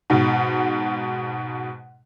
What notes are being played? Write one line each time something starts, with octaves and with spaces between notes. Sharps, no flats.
G#2 B2